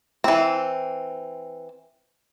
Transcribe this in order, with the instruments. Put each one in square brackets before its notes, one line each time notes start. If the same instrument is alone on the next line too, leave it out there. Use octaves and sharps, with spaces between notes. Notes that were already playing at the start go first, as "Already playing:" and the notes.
[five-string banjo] E3 C4